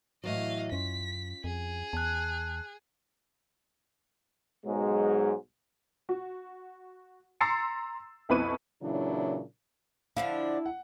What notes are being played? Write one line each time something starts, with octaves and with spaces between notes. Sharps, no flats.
A2 E3 F#3 D#5 F5
F#2 C#4 F4 B6
F2 G#4
E2 A5 F#6
B1 G#2 F#3 G#3
F#4
A#5 C6 E6 A6 C7 C#7
B1 F2 E4 B4 C#6 D#7
A#2 C#3 E3 F#3 D4 E4
D3 F3 D4 E4 F5 A5
F#5